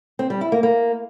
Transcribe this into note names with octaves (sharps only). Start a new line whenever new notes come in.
C4
G3
E4
A#3
A#3